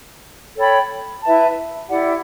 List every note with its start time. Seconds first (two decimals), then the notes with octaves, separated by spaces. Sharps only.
0.55 A4 C#5 G5 B5
1.22 E4 B4 E5 A5
1.89 E4 G4 D5 F#5